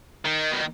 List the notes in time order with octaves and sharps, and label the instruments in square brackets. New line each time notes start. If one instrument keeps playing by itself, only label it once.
[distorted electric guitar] D#3
B2